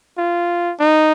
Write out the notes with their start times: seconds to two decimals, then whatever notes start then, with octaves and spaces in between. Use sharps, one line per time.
0.18 F4
0.79 D#4